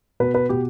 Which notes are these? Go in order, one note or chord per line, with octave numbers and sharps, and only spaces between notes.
B2 B4
B4
B2 G4